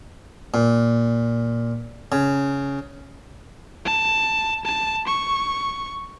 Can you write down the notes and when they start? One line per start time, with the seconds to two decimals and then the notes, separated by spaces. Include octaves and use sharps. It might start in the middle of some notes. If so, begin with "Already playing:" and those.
0.54 A#2
2.12 C#3
3.85 A5
4.65 A5
5.07 C#6